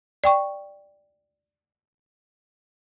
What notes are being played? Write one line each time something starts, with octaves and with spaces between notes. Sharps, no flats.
D5 G5 C#6